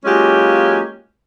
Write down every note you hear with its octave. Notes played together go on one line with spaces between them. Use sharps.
F#3 G#3 A#3 C#4 F4 G4